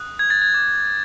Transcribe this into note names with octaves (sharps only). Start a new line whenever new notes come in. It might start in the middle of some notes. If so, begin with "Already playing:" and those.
Already playing: D#6 F#6
G#6
A6
G#6
D6 G6